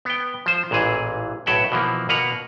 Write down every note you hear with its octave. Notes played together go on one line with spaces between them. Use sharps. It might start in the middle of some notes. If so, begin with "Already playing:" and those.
B3 G5
F3 C5
A1 A#2 E3 G#4
B1 A2 F#3 E5 F#5 G5
B2 E3 F3 A#3
B2 A#3 B4 F#5 A#5